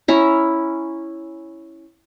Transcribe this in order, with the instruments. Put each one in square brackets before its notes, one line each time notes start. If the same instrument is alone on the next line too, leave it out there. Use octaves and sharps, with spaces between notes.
[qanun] C#4 E4 A#5